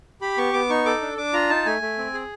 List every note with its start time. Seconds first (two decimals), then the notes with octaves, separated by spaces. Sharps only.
0.21 G4 B5
0.38 B3 C#6
0.53 B3 D6
0.70 D#4 C#6
0.86 A4 D6
1.01 D4
1.18 D4 D6
1.33 F4 A#5
1.50 D#4 A5
1.66 A3 G#5
1.82 A3
1.98 C4
2.14 G#4